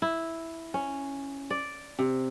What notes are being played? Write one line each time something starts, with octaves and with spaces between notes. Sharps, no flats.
E4
C#4
D5
C3